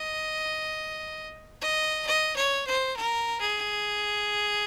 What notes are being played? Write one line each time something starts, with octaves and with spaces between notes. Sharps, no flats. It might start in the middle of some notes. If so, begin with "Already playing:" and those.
Already playing: D#5
D#5
D#5
C#5
C5
A#4
G#4